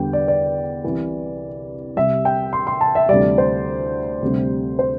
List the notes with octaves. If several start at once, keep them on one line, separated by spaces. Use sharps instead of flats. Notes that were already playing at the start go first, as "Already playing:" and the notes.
Already playing: E2 D3 G3 G5
D5
D5
C2 C3 E3
C2 C3 G3 E5
G5
C6
C6
A5
E5
D2 C3 E3 G3 D5
C5
D2 C3 G3
C5